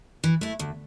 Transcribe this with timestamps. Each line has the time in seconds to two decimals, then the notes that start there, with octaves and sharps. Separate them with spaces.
0.24 E3
0.41 A3 E4
0.59 D2